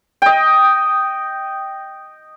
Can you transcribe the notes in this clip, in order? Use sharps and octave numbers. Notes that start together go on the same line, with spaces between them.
D#5 G5